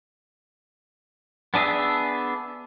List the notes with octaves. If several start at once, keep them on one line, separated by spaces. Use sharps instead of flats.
B3 D4 G#4 E5